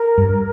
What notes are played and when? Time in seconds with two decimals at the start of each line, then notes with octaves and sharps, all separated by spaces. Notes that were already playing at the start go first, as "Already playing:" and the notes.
Already playing: A#4
0.18 G2